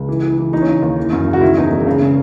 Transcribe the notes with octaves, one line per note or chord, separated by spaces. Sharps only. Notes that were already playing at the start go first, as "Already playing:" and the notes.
Already playing: C#2
E3
E3
E3
E3 D#4
C#4
C#3 D#4
D#2
E3
F#2
C#3
F#4
D#3 E4
E2 D#4
E1
C#3
C#3